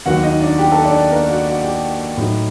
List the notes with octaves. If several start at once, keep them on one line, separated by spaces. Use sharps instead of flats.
D#2 D#3 F#3 A#3 F#4 F#5
D#4 D#5
D4 D5
G4 G5
A4 A5
D4 D5
A#3 A#4
F#4 F#5
F#4 F#5
G4 G5
A2 F#3 A3 D#4